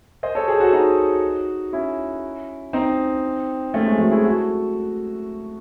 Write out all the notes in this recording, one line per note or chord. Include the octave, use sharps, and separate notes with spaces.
C5 D#5
A4 C#5
G#4 C5
F#4 A4
D#4 F#4
C#4 E4
C4 D#4
A3 C#4
G#3 C4
F#3 A3
E4 G#4
F#4 A4